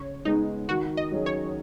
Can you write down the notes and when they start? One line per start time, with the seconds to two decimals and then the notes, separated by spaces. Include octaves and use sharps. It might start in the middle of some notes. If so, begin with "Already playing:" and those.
Already playing: C#3 C#5
0.25 G#3 B3 D#4 G#4
0.68 D#3 F#4
0.97 D#5
1.12 F#3 C#4 G#4
1.26 C#5